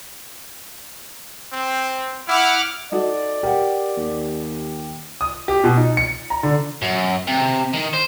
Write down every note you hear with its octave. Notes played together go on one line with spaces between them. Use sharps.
C4
E4 F#5 D6 F6
D#4 F#4 A4 D5
G4 A#4 F#5
D#2
D#6
G4
B2
D#4
C#7
A#5
D3
F#2
C3
D#3
C5